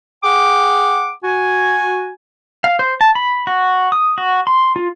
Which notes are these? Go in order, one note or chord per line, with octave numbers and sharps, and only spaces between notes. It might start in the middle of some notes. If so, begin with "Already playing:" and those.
G#4 F#5 G5 D6
F#4 G#5
F5
C5
A5
B5
F#4
D#6
F#4
C6
F4